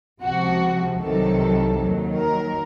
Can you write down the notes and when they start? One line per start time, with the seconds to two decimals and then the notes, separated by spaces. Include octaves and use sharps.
0.22 C#2 C3 F3 F#4
1.00 C2 C3 D#3 F#3 A4
1.78 D#2 D#3 F#3
2.16 A#4